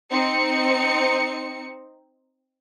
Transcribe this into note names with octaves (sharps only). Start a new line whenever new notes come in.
C4 D#4 C#7